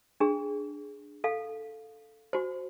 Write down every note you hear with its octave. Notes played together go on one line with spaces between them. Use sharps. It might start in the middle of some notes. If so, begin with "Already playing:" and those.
D4 G#4
A4 F5
F#4 C5